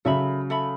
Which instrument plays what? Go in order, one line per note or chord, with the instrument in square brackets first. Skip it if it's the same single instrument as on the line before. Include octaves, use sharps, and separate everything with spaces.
[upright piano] C#3 F#3 [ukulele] A4 E5 B5
[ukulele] A4 E5 B5